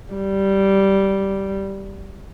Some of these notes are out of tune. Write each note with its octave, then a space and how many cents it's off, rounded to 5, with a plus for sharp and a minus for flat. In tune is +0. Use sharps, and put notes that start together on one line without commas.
G3 -10